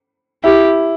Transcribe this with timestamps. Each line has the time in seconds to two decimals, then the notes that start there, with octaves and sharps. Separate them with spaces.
0.44 E4 G4